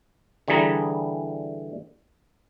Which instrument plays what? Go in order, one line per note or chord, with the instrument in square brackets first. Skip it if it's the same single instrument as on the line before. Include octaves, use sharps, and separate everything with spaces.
[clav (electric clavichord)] D3 E3 G3 G#4 A#5